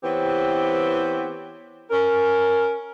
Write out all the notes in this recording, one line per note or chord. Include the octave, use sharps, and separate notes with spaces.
E3 B3 C4 G4 C#5
C#4 A#4